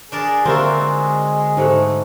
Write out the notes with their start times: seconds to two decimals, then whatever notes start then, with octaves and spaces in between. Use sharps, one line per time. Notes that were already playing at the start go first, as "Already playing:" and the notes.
0.12 D4 G#4 A#4 D5
0.45 D3 A#3 C4 F4 F#4 A#4 E5
0.78 G#3
1.57 G#2 A3 F#5